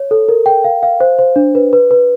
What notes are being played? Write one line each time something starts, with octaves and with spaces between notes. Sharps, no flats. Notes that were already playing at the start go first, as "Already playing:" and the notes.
Already playing: C#5
A4
A#4
G5
F5
F5
C5
C5
D4
B4
B4
B4